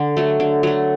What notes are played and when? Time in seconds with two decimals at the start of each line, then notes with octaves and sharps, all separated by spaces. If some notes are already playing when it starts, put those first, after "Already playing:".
Already playing: D3
0.17 F#3 A3
0.40 D3
0.63 F#3 A3